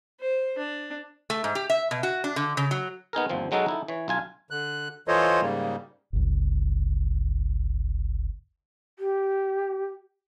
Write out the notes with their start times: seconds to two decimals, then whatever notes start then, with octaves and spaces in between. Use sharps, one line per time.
0.20 C5
0.58 D4
1.30 A3
1.44 G#2
1.55 G4
1.70 E5
1.91 B2
2.03 F#4
2.24 D4
2.36 D3
2.57 C#3
2.71 F#3
3.13 B3 D#4 G#4 A#4
3.29 G1 D#2 F3 C4
3.51 B2 F#3 G#3 D#4 F#4 A4
3.66 D#4 E4 A4
3.88 E3 C#5
4.08 B1 F4 G#5
4.51 D3 F#6
5.08 E3 F4 A4 C5 C#5 D#5
5.41 G#2 C#3 G3 A#3
6.13 G1 C#2
8.99 G4